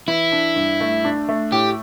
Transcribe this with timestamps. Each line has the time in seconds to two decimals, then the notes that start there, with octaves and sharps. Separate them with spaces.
0.07 E3 E4
0.32 D4
0.56 G2
0.81 A3
1.05 D4
1.29 A3
1.51 A2 G4